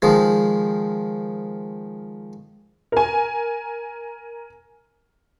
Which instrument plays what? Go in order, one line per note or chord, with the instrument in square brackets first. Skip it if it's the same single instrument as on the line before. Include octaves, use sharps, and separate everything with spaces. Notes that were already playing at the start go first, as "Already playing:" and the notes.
[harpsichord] D#3 F3 G#3
[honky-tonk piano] A#4 G#5